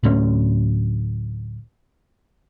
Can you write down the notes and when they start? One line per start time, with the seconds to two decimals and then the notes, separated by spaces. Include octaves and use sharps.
0.03 D1 D2 A3 C#4